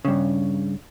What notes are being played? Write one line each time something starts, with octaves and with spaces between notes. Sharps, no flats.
G2 C#3